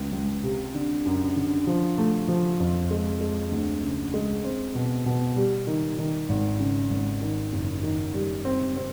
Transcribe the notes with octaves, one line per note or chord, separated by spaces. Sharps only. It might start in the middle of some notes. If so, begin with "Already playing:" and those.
Already playing: C#2
C#2
C3
D3
F#2
D3
F3
A3
F3
F2
G#3
G#3
D2
C#3
G#3
C4
B2
B2
G3
D#3
D#3
G#1
C#3
G#1
D#3
F#1
D#3
G3
C4
C4